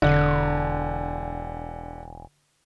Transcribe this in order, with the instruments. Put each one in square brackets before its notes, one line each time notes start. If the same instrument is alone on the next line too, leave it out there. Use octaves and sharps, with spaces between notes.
[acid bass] E1 [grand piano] D3